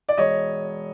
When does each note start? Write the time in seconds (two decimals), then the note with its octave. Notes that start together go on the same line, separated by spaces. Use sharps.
0.09 D5
0.18 E1 C#5 D#5